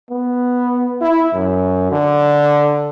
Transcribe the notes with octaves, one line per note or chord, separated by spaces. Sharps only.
B3
E4
F#2
D3